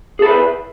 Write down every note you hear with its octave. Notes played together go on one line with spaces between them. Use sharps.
E4 G#4 A4 B4